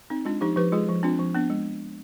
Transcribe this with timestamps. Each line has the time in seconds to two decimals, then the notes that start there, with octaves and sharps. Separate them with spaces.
0.10 C4 D#4
0.25 G#3 D4 F4
0.41 F3 D#4 G4
0.56 F3 G4 B4
0.72 G#3 F4 G#4
0.89 F3
1.03 C4 D4 F4
1.19 F3
1.35 B3 D4
1.50 G#3